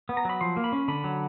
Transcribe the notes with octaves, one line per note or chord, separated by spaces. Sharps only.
B3
A#5
F#3 B5
F3 C6
A#3
B5
C#4
D3 B5
F#3